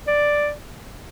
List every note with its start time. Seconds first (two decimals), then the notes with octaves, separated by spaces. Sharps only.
0.07 D5